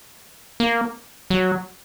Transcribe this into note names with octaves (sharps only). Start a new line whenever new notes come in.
A#3
F#3